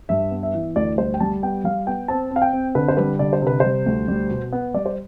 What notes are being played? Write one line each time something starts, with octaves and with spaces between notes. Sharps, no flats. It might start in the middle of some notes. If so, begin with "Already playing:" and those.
G2 E5
B3
E5
E3
D2 D5
G3 C5
G5
G3 A5
B3 G5
G3 F5
B3 G5
C4 A5
C4 F5
G5
C4
D3 B4
C5
G3 B4
D3 D5
C5
C3 B4
G3 C5
D2
G3
B2
B3
G3 D5
C5